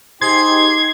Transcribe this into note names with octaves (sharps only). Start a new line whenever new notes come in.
D#4 G4 G#4 C5 C6 G#6 C7